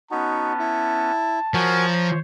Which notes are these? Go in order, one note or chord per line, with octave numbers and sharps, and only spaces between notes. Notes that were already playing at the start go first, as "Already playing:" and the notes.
B3 C#4 D#4 F#4 A5
E4
F3 F#4 A#4 C5 C#5 G#5
A#5